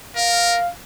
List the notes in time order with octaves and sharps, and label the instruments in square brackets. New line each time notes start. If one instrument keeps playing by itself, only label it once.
[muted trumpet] A#4 [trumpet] F5